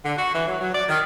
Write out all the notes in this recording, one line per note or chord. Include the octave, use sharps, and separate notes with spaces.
D3
F#4
E3
F#3
F#3
D5
D#3